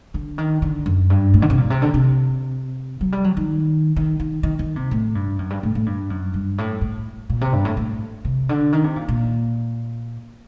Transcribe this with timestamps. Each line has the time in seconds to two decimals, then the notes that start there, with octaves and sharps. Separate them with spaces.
0.14 D3
0.38 D#3
0.62 D3
0.86 F#2
1.10 G2
1.34 A2
1.42 D3
1.50 C3
1.58 A#2
1.70 C3
1.82 D3
1.94 C3
3.01 F#3
3.12 G3
3.24 F#3
3.37 D#3
3.96 D#3
4.20 D#3
4.43 D#3
4.59 D#3
4.76 C3
4.91 A2
5.15 G2
5.39 F#2
5.50 G2
5.63 A2
5.75 A2
5.86 G2
6.10 F#2
6.34 G2
6.58 A2
6.81 A2
7.30 A#2
7.41 C3
7.53 G2
7.65 A2
7.77 A2
8.25 C3
8.49 D3
8.72 D#3
8.84 C3
8.96 A#2
9.08 A#2